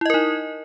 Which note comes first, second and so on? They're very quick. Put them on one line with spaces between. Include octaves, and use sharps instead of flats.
E4 D#5 A#4 D#4